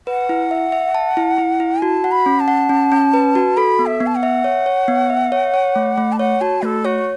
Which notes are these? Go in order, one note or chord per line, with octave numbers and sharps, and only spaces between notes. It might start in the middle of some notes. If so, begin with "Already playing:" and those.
B4 F#5
E4
E5
E5
A5
E4
E4
E4
F#4 A5
F#5
B5
C#4
A5
F#5
C#4
C#4
B4
F#4
A4 B5
B3
E5
B3
A5
F#5
E5
C#5
C#5
B3
E5
C#5
C#5
A3
A3
A5
C#5 F#5
F#4 A5
A3 A4
F#4 C#5